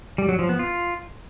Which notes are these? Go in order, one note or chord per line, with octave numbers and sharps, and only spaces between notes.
G3
F#3
F3
B3
F4